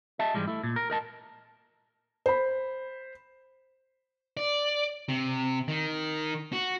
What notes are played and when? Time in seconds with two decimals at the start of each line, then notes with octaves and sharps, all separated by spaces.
0.19 D#5 E5 A5
0.34 G#2 B2 E3 G3 G#3
0.47 A3 E4
0.63 A#2
0.76 A#4
0.90 A#4 D#5 A5
2.26 C5 B5
4.37 D5
5.09 C3
5.68 D#3
6.53 F#4